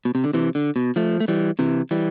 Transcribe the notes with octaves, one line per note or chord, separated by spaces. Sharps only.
B2
C3
D3
C3 E3
D3
B2
F3 A3
A3
E3 G3
C3 E3
E3 G3